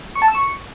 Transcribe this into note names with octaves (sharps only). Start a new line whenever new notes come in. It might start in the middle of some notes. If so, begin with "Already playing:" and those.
C#6
A5
E6
C#6